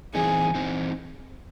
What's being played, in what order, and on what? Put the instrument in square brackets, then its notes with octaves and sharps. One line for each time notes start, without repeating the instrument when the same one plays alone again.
[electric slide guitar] E3 C4 D#4 [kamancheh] G#4
[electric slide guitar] E3 C4 D#4